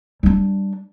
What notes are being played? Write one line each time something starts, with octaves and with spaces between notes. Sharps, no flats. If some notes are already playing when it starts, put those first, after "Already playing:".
G3 D4